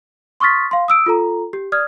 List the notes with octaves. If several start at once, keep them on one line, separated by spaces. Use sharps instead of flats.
C6 C#6 D#6 F6 A6 B6
F5 C6
D#6 E6 D7
F4 A4 A#5
G4
D5 D#6 F6 G#6